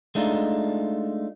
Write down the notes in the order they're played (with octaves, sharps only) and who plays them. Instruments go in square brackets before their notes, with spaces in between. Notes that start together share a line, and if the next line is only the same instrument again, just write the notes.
[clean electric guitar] G#3 A3 D4 D#4 F4